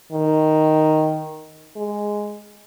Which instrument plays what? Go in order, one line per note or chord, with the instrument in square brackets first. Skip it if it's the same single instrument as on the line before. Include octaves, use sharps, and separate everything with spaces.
[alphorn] D#3
G#3